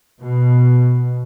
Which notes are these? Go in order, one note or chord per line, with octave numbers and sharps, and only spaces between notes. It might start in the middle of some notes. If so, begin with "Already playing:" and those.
B2